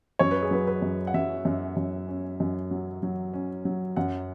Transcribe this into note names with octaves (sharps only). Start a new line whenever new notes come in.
F#2 C#5
B4
G#4
F#3 B4
B4
F#2
F#5
F#2 E5
F#2
F#2
C#4
F#2
F#3
F#3
C#4
F#3
F#2 F#5